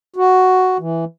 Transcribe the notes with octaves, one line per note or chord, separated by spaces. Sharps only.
F#4
E3